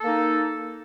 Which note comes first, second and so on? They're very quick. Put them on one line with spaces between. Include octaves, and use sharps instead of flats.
A4 A#3 D#4